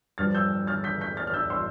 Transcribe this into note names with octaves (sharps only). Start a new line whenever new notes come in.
G2 F3 F6 A6
E6 G6
F6 A6
G6 B6
G6 B6
F6 A6
F6
E6 G6
C6 E6